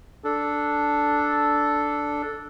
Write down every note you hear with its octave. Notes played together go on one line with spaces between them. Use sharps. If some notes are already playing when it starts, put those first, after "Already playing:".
D4 A4